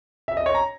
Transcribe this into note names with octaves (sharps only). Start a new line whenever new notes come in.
E5
D#5
C#5
A#5